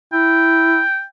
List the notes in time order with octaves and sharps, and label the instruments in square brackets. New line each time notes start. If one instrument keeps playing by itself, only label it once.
[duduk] E4 [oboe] G5